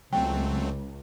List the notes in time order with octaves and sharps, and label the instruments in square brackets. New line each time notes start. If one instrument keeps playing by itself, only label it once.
[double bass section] C#2 [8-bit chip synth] F#3 A3 C4 [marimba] G5